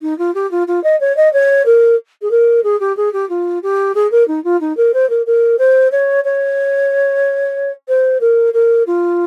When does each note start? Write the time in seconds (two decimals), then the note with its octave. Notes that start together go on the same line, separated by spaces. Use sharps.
0.02 D#4
0.18 F4
0.35 G4
0.51 F4
0.68 F4
0.84 D#5
1.00 C#5
1.17 D#5
1.33 C#5
1.66 A#4
2.22 G#4
2.31 A#4
2.64 G#4
2.80 G4
2.97 G#4
3.13 G4
3.29 F4
3.63 G4
3.95 G#4
4.12 A#4
4.28 D#4
4.44 F4
4.61 D#4
4.77 A#4
4.94 C5
5.10 A#4
5.26 A#4
5.59 C5
5.92 C#5
6.24 C#5
7.88 C5
8.21 A#4
8.54 A#4
8.87 F4